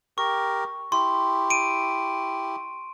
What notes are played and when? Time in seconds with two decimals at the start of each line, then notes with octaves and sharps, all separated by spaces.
0.18 G4 A#4 C#6
0.92 E4 G4 C6
1.50 D7 D#7